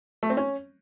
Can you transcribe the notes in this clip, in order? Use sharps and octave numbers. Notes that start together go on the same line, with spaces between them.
A3
C4
C#4